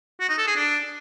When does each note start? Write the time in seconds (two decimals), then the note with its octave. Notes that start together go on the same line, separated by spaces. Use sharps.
0.20 F#4
0.29 D#4
0.38 A4
0.47 G#4
0.56 D4